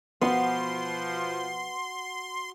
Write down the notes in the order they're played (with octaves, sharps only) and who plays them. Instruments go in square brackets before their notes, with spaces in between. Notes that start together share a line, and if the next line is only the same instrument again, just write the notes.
[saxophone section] B2 F3 [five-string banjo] B3 [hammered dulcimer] F#4 B5 [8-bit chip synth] C6